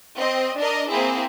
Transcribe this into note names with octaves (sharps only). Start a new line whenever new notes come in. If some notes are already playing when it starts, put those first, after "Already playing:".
C4 D#5
D4 A#4 D#5
A#3 C4 E4 G#4